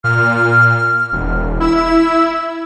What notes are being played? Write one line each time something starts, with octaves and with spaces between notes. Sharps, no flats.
A#2 F6
E1
E4 E6